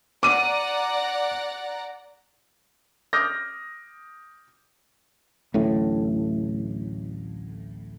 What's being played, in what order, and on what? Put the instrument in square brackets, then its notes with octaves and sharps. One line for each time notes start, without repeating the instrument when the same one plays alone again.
[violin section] D5 F#5 A#5 [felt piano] D6 D#7
[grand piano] D6 D#6 F6 G6 A#6
[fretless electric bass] D1 A1 A2